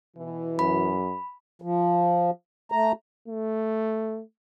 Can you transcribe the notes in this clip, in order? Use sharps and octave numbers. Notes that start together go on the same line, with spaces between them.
B2 E3
F#2 B5
F3
A3 A#5
A3